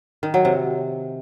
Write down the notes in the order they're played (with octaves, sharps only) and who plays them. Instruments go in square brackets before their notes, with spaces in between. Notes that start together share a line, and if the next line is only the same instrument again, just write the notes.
[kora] D#3
F#3
C3